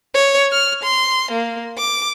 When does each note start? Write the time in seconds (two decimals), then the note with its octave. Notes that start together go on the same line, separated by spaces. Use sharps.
0.14 C#5
0.52 F6
0.83 C6
1.31 A#3
1.77 D6